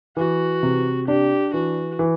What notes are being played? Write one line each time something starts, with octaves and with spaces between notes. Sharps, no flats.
E3 F#4
C3
D4 G4
E3 F#4
E3